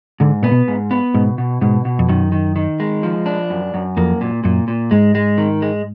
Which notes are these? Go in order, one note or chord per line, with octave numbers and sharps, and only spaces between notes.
G#2 D3
A#2 B3
B2
G#2
B3
G#2 B2
B2
G#2 B2
B2
F2
F#2 D#3
D#3
D#3
G#3
F3
D4
F#2
F#2
F2 A#3
A#2
F#2 A#2
A#2
G#2 G#3
G#3
D#3
G#3